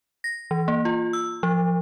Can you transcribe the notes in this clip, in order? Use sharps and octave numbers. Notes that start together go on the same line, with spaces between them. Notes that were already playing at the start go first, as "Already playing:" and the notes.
A#6
E3
A#3
F4
E6
F3